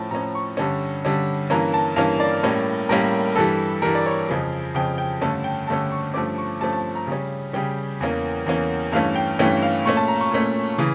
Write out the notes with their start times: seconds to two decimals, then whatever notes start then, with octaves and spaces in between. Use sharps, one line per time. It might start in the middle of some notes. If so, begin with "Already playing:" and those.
Already playing: A2 F3 C#4 A5 C#6
0.11 A2 F3 C#4 A#5
0.35 C#6
0.57 G2 D3 G3 C#4
1.05 G2 D3 G3 C#4
1.50 G2 E3 A#3 C#4 A#5
1.74 A5
1.96 G2 E3 A#3 C#4 F5
2.20 D5
2.43 A2 G3 A#3 C#4
2.89 A2 G3 A#3 C#4 A#4
3.36 G2 E3 G3 A4
3.82 G2 E3 G3 A#4
3.95 D5
4.06 C#5
4.29 F2 C#3 F3
4.75 F2 C#3 F3 G5
4.98 G5
5.21 G2 D3 A3 C#4 A5
5.44 G5
5.67 G2 D3 A3 C#4 A5
5.92 C#6
6.14 G2 F3 A3 C#4 D6
6.38 C#6
6.61 G2 F3 A3 C#4 A5
6.73 A5
6.95 A#5
7.07 C#3 G3 C#4
7.53 C#3 G3 C#4 G5
8.00 E2 E3 A#3 C#4
8.46 E2 E3 A#3 C#4
8.92 G2 E3 A3 C#4 F5
9.15 G5
9.39 G2 E3 A3 C#4 G5
9.62 F5
9.86 A#2 A3 C#4 C#6
9.97 A5
10.08 A#5
10.21 C#6
10.31 A#2 A3 C#4
10.78 C#3 E3